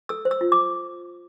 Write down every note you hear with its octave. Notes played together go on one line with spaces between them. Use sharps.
A4 E6
C5
E6
F4
D6